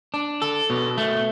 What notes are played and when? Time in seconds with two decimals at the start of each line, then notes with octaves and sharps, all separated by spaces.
0.14 D4
0.42 A4
0.70 B2
0.98 A3